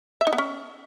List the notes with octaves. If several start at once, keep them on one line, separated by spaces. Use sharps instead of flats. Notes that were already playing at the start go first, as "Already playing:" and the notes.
E5
D#4
B3
C#4